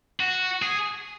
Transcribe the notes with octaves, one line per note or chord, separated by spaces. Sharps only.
F#4
G#4